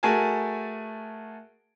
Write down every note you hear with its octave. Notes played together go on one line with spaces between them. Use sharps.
A3 F#4 G#4 A#4 G#5 A5